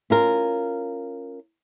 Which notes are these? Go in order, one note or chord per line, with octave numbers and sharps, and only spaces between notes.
C#4 F4 A#4